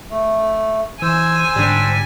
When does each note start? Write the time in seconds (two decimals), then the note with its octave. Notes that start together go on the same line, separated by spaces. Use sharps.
0.11 A3
1.02 E3 C5 G#5 E6
1.56 G#2 D3 G3 D4